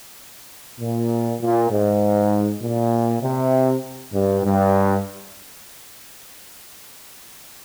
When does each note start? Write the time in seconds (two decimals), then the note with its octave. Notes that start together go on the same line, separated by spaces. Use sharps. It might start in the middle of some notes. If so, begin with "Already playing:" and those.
0.80 A#2
1.41 A#2
1.71 G#2
2.62 A#2
3.23 C3
4.14 G2
4.44 G2